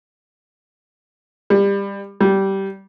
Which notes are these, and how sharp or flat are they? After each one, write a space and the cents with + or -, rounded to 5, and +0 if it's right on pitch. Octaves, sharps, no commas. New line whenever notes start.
G3 +25
G3 -15